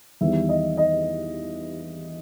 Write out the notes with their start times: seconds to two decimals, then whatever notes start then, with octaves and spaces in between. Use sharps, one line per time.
0.21 E2 D#3 G3 B3 E5
0.49 D#5
0.77 D#5